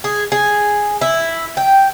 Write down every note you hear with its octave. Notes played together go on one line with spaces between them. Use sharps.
G#4
G#4
E4
G5